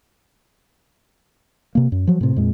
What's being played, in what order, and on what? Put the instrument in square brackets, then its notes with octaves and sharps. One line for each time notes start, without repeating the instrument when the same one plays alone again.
[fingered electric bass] C3 A#3
F#2
F3 F#3
A2 C3
F2 A#2 G#3